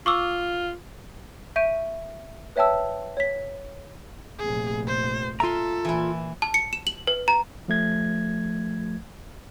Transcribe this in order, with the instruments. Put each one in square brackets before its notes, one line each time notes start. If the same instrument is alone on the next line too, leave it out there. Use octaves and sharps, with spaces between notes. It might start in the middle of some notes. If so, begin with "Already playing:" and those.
[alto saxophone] F4 [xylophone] C#6 D6 E6
[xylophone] E5 C#6 G6 D7 D#7
B4 C#5 E5 G5 A5 E6
C#5 B6
[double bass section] F1 A#1 [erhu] G#4
[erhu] C5
[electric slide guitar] F4 A#5 [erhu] A4 [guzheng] E5 C6
[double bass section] A#2 [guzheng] E3 E4
[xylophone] A5
C#7
E7
F#7
B4
A#5
[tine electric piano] F3 A3 G#6